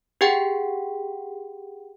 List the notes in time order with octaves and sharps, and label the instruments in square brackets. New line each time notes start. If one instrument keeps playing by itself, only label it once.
[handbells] G4 G#4 F#5 G5